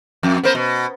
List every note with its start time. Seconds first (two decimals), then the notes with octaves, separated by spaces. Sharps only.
0.23 F2
0.43 B3 A#4 C5
0.55 B2